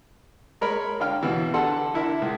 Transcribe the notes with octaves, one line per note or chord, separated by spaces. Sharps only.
G#3 A#4 C#5 B5
D3 C#4 F5 G5 F6
B2 E3
D3 A4 F#5 C6
D3 E4 A#4 E5
C#2